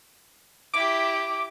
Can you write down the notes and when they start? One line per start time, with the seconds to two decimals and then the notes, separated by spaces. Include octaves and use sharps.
0.74 E4 G4 D6